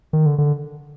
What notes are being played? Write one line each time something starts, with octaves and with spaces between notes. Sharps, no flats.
D#3
D3
D3